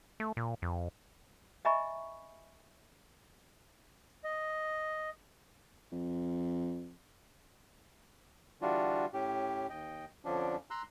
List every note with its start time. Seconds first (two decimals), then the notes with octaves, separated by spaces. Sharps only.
0.20 A3
0.37 A#2
0.62 F2
1.65 D#5 E5 G#5 A#5 B5 C#6
4.24 D#5
5.92 F2
8.62 D3 E3 G3 D4 F4 F#4
9.13 A2 C#4 G4
9.70 D#2 D#5 G5
10.25 F2 D3 F3 C#4 D4
10.71 A#5 C6 E6 F#6